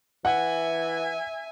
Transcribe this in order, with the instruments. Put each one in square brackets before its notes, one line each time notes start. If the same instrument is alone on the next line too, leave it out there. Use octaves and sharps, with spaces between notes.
[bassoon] E3 [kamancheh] E5 G#5 [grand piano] F#5